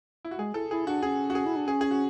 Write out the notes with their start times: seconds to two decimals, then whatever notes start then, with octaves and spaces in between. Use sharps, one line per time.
0.25 E4
0.31 F#4
0.39 G#3 G#4
0.54 E4 A4
0.71 E4 G#4
0.87 D4 F#4
1.03 C#4 G#4
1.30 F#4
1.35 G#4
1.46 E4
1.56 D4
1.67 C#4 G#4
1.81 G#4
1.91 F#4